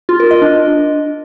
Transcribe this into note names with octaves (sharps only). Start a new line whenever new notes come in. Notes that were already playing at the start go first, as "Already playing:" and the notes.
F4
A#4
D#5
D4